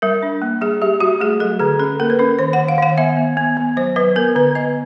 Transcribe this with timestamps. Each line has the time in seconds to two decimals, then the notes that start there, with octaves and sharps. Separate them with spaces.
0.02 G3 A#4
0.23 D4
0.42 A#3
0.61 G3 G#4
0.82 G3 G4
1.00 G3 F#4
1.20 A3 G#4
1.40 F#3 A4
1.60 D3 G#4
1.79 C#4 A4
2.00 A#3 A#4
2.10 B4
2.19 C#4 A#4
2.39 D#3 C5
2.53 F#5
2.59 D#3
2.69 F5
2.78 D#3 F#5
2.98 B3 E5
3.17 B3
3.37 B3
3.57 B3
3.77 F#3 C5
3.96 F#3 B4
4.16 B3 A#4
4.35 D3 B4
4.55 B3 D#5